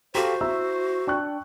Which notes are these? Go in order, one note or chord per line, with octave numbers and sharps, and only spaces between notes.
F#4 G4 A4 C5 F5 A#5 C6 B6
E4 E5 A#5 E6
D4 G5 C#6 F#6